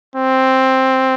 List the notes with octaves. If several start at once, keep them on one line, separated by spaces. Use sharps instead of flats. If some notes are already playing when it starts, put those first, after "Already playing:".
C4